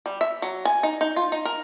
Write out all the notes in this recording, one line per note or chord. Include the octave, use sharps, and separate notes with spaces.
G3
E5
F#3
G#5
D#4
D#4
F4
D#4
A#4